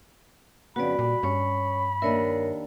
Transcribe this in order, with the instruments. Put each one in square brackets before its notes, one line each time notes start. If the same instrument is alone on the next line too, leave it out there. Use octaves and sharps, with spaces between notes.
[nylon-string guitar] F2 C#3 B3 [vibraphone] F#4 D5 [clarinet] B5
[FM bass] A#2 [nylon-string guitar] G3
[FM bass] G2 [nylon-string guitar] C#4 [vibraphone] C#5 C#6
[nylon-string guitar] D#2 D4 E5 [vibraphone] A#4 C#5 D#5